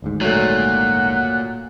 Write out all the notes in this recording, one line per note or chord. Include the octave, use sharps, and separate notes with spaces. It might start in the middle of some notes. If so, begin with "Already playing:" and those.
G#1 D2 G#2
A#2 F#3 A3 F#5